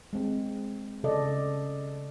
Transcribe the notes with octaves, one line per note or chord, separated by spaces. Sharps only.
G#3 C4
C#3 A4 D5 D#5